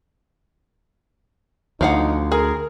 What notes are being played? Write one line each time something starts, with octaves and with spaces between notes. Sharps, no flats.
D2 F3 D#4 F5 F#5
G#4 A#4